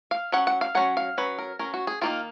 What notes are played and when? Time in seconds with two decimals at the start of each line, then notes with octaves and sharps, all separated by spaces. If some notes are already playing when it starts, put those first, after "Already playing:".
0.11 F5
0.32 F#3 C#4 F#5
0.47 F#5
0.61 F5
0.75 F#3 C#4 F#5
0.97 F5
1.17 F#3 C#4 B4
1.38 A#4
1.59 F#3 C#4 A#4
1.74 F#4
1.87 G#4
2.01 D#3 A#3 D#4 F4